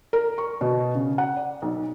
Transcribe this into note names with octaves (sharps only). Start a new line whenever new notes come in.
A#4
C#6
B2
C#3
F#5
D5
B1